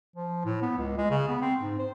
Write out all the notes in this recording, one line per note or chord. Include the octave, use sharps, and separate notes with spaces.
F3
A2
B3
C#2
G#3
C#3
B3
C4
G#2
C5